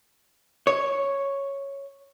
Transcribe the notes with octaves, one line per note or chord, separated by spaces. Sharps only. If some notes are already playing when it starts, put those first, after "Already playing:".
C#5